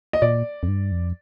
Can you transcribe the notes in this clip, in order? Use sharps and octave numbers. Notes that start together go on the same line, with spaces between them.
D#5
A#2 D5
F2
G2
F2